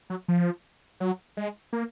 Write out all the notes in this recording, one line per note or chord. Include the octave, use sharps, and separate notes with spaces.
F#3
F3
F#3
G#3
A#3